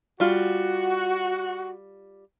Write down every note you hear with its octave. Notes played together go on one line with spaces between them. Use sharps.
G3 F4 F#4